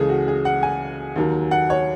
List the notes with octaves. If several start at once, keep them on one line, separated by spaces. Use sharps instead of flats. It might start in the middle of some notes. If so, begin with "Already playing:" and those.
Already playing: C#2 C#3 E3 G#4 A4
F#4
G#4
F#5
G#5
D#2 D#3 F#3
F#5
C#5